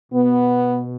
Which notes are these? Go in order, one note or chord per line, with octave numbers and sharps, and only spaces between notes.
B2 B3